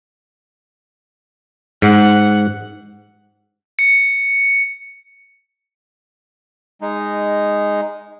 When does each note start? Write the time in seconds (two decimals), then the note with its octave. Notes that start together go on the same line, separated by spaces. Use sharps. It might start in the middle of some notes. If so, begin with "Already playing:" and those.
1.82 G#2 F#5
3.79 C#7
6.81 G#3 D#4